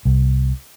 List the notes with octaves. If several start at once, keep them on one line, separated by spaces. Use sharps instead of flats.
C2